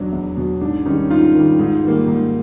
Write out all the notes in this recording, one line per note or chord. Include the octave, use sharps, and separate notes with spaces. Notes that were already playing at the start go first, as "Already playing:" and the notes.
Already playing: E2 B2 F#3 D4
E2
B2 F#3
G#2 D4
D#3 G3 C#4 D#4
G#2 D#4 F4
D#3 G3
G#2
D#3 G3 A#3
G#2